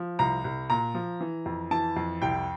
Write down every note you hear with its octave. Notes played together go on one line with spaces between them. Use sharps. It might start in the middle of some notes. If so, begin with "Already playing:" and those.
Already playing: F3
C2 A#5
C2
A#2 A#5
F3
E3
F2
E3 A5
F2
C2 G5